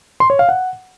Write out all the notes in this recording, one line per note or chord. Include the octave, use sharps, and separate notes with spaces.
C6
C#5
F5
F#5